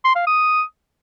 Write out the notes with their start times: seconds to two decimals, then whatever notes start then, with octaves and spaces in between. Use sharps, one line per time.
0.04 C6
0.16 F5
0.27 D#6